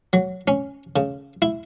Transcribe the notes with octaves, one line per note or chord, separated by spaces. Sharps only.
F#3
C#4
C#3
E4